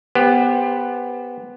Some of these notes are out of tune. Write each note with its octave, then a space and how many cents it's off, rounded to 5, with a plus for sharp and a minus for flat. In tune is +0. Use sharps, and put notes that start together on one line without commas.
B3 +0 G4 +25 C5 +0